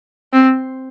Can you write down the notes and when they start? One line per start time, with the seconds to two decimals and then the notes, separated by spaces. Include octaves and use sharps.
0.33 C4